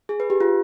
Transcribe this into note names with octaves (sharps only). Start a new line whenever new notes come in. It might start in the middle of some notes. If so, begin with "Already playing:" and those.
G#4
B4
G4
F4